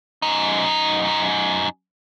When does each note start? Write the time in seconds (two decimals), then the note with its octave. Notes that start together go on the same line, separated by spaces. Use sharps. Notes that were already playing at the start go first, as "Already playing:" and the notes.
0.22 F#2 D#4